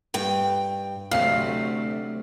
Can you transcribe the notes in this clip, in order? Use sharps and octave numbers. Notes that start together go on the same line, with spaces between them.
G2 G5
D2 C3 F#3 A3 F5 C7